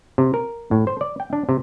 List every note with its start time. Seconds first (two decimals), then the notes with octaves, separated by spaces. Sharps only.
0.18 C3
0.34 A#4
0.71 A2
0.87 C5
1.01 D5
1.20 G5
1.33 D4
1.49 C3